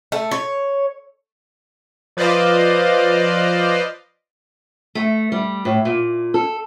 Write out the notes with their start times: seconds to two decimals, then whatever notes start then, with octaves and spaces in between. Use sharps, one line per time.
0.12 A3
0.31 C#5
2.17 F3 B4 C5 D5 D#5 F5
4.95 A3
5.32 G3
5.65 A2
5.85 A#2
6.34 A4